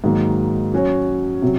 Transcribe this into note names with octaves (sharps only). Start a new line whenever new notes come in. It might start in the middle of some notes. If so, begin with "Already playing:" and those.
G#2 D#3 F#3 A#3
F#3 C#4 F#4 C#5
C3 F#3